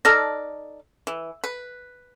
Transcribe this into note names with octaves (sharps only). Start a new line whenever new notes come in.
D#4 A4 D5 F6 A#6
E3
B4